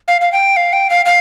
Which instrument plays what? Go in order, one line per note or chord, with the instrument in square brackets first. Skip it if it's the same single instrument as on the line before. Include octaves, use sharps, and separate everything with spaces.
[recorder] F5
F5
G5
F5
G5
F5
F5